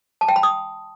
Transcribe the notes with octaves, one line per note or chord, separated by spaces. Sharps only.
A5
G5
B5
D#6